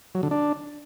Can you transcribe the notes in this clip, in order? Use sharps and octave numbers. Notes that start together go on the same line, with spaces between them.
F#3
D3
D4